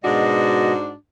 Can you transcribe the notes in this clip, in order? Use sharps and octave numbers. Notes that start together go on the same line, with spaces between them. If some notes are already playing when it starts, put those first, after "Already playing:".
G#2 B2 G#3 D4 F#4 D#5